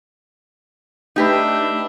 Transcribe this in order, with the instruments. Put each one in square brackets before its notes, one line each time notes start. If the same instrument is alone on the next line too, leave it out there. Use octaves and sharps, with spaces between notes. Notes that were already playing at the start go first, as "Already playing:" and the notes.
[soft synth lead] A3 [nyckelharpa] D4 E5 [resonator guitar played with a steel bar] D#4 G4 B4